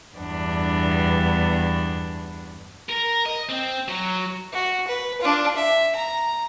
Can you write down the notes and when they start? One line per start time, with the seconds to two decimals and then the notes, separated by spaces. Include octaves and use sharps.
0.16 E2 G2 B3 D4
2.89 A#4
3.26 D#5
3.49 C4
3.88 F#3
4.53 F#4
4.87 B4
5.21 D4 F4
5.56 E5
5.95 A#5